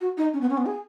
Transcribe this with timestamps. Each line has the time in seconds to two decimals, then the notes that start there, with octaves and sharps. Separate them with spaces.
0.01 F#4
0.17 D#4
0.34 C#4
0.41 B3
0.50 C#4
0.57 B3
0.66 G#4